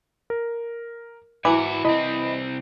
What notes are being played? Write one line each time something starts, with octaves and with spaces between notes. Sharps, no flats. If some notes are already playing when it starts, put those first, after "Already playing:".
A#4
G#2 E3 E4 F#4 B5 D6
C2 C4 E4 D#5 B5